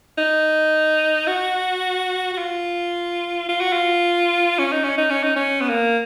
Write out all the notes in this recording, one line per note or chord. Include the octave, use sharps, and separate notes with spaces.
D#4
F#4
F#4
F4
F4
F#4
F4
C#4
D#4
C#4
D#4
C#4
D#4
C#4
B3
A#3